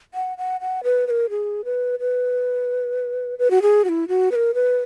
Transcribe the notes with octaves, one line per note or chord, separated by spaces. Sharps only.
F#5
F#5
F#5
B4
B4
A#4
G#4
B4
B4
B4
F#4
G#4
F#4
E4
F#4
B4
A#4
B4